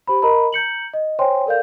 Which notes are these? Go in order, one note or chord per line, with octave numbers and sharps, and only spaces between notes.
G4 C5 B5
A#4 D#5 A#5 B5
A#5 G6 C#7 F#7
D#5
C5 C#5 G5 G#5 C6
A4 A#4 D5 F5 G6